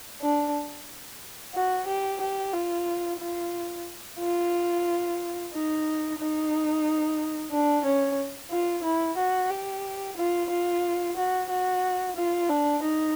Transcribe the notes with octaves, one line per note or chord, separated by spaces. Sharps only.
D4
F#4
G4
G4
F4
F4
F4
D#4
D#4
D4
C#4
F4
E4
F#4
G4
F4
F4
F#4
F#4
F4
D4
D#4